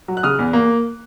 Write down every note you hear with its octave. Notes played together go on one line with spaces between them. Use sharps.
F#3
F#6
C#3 D#6 F6
E2
A#3